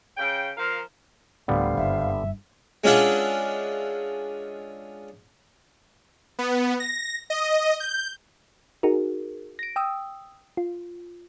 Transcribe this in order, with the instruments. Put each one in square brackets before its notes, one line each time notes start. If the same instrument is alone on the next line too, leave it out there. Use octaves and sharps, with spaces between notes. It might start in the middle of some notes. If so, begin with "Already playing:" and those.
[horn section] C#3 G5
F3 A#4 F5
[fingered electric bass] D1 A2 [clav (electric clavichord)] D3 G3 B3 [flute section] C5 F5
[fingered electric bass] F#1 G2 [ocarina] E5
[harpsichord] G#3 C#4 D4 F4 E5 F#5
[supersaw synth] B3
A#6
D#5
G6
[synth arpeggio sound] D#4 F#4 G#4 A#4
A#6 D7
G5 D#6 E6
F4